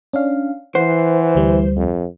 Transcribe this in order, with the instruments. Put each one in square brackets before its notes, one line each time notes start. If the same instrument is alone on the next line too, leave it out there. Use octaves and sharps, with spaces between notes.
[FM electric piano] C#4 D4 F5
[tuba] E3 [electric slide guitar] C5 [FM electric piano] F#5
[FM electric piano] D2 G3
[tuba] F2